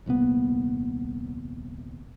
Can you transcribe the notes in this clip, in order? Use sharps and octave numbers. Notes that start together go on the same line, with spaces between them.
D#1 C2 A#3 B3